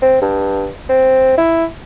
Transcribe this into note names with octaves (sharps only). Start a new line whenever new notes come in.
C4
G2
C4
E4